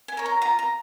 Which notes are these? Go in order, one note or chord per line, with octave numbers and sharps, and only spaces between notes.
G#5
A#4 C#5
A#5
F4 A#5
A#5